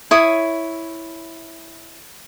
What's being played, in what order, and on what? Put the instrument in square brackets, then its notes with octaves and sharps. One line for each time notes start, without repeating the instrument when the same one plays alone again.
[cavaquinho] E4 C#5 D#6